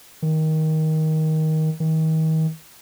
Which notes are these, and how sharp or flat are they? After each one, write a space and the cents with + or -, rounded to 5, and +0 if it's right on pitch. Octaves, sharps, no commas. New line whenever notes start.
D#3 +15
D#3 +35